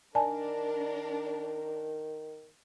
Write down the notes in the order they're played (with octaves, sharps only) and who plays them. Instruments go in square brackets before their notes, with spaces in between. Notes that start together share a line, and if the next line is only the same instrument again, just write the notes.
[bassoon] D#3 [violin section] D4 A#4 [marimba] D5 G#5 A5